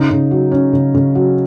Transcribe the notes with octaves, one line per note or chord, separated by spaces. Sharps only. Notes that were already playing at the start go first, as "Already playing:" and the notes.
Already playing: C#3 D#4
C#3
F#3
C#4
C#3
C#3
F#3